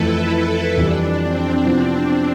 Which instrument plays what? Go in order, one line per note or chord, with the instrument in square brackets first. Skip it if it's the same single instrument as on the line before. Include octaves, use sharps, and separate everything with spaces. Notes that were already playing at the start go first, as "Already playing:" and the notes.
Already playing: [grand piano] F2 E3 A3 [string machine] E4 A4 B4
[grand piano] F2 E3 G3 [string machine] D4
[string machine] C4
[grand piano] C3 F3 B3 E4 [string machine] D4